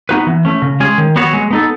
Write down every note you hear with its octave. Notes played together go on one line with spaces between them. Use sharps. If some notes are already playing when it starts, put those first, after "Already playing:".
B3 D#4 F#4 B4
E3
A3 C#4
C#3
G#3 C#4 G#4
D#3
F#3 B3 F#4 C#5
G#3
B3 D#4 A4